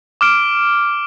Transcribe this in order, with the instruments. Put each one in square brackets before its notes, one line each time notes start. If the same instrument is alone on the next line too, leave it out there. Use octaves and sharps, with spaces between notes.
[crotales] D6 F6 D7